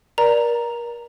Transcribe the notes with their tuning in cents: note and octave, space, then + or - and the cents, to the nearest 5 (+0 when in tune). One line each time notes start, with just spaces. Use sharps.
A#4 +30 D5 +0 A#5 +0